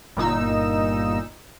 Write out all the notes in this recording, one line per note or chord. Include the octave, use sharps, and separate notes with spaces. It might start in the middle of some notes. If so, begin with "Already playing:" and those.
G1 A#2 D#4 E6